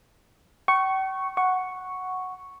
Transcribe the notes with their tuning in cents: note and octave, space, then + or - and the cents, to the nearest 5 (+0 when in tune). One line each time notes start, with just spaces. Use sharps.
G5 -45 C#6 +0
F#5 +0 C#6 +0